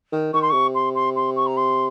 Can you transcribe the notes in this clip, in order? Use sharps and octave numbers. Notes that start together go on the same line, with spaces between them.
D#3
D#3 C#6
C6
C3 C#6
C6
C6
C6
C#6
A#5
C6